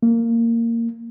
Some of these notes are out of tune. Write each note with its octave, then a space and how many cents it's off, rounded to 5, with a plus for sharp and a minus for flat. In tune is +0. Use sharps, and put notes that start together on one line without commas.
A#3 -15